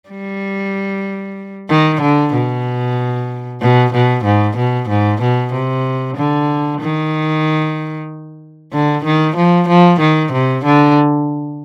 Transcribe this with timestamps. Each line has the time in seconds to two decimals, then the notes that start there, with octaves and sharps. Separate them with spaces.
0.10 G3
1.69 D#3
2.02 D3
2.34 B2
3.61 B2
3.93 B2
4.25 G#2
4.57 B2
4.89 G#2
5.22 B2
5.53 C3
6.17 D3
6.81 D#3
8.73 D3
9.05 D#3
9.37 F3
9.68 F3
10.00 D#3
10.32 C3
10.65 D3